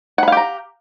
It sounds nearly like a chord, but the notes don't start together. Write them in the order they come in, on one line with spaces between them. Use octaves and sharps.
F#5 B5 F5 G4 A#5